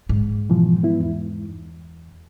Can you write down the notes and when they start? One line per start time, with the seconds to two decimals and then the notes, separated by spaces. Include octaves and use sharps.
0.09 G#2
0.50 B2 E3 F3
0.83 B3 E4
1.00 E2